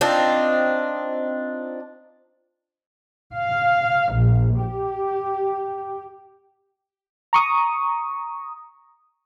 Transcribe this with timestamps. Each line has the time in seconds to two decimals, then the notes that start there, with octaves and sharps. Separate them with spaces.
0.01 C4 D4 D#4 F4
3.34 F5
4.14 A#1
4.62 G4
7.33 A#5 C#6 D#6